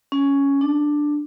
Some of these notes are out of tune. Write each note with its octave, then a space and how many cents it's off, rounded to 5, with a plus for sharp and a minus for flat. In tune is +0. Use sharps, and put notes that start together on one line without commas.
C#4 +5
D4 +5